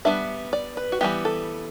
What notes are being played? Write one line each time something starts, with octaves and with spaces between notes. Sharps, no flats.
G3 B3 D4 E5
D5
B4
F#4
E3 G3 B3 G4
A4